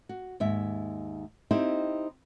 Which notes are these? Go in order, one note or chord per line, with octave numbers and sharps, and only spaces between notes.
F#4
D#2 G#2 E5
C4 D#4 E4 G4 C5